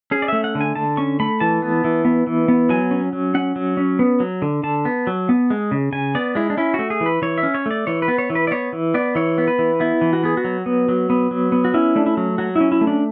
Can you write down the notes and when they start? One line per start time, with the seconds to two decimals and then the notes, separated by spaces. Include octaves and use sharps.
0.11 C#4 G#4
0.22 D5
0.28 A3 E5
0.44 F#5
0.55 D3
0.61 G#5
0.76 D3 A5
0.97 C#4 C#6
1.20 A3 B5
1.40 E3 A5
1.62 B3
1.84 E3
2.05 B3
2.27 E3
2.48 B3
2.69 F#3 G#5
2.91 C#4
3.13 F#3
3.34 C#4 F#5
3.56 F#3
3.77 C#4
3.99 B3
4.20 F#3
4.42 D3
4.63 D3 A5
4.85 B3
5.07 F#3
5.29 B3
5.50 G#3
5.71 C#3
5.92 C#3 G#5
6.15 B3 D5
6.35 G#3 E4
6.50 D4
6.57 C#4 E4
6.74 A3 F#4
6.90 G#4
7.01 E3
7.06 B4
7.22 E3 C#5
7.38 E5
7.43 C#4
7.55 C#5
7.66 A3 D5
7.87 E3 C#5
8.02 B4
8.08 B3
8.18 C#5
8.30 E3
8.35 B4
8.47 D5
8.51 B3 C#5
8.73 E3
8.94 B3 D5
9.15 E3 C#5
9.38 B3
9.48 B4
9.59 E3
9.80 B3 E4
10.01 E3
10.13 F#4
10.23 B3 G#4
10.37 F#4
10.44 F#3
10.66 B3
10.89 F#3
11.10 B3
11.31 F#3
11.52 B3
11.65 F#4
11.74 C#4 E4
11.96 A3 D4
12.06 E4
12.17 F#3
12.38 F#3 F#4
12.56 C#4 E4
12.72 E4
12.81 A3
12.87 D4